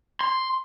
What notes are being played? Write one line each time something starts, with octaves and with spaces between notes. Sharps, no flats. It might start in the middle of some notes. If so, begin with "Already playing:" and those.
C6